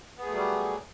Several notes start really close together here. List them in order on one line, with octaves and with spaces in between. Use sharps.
B3 G#4 A3 F#3 G3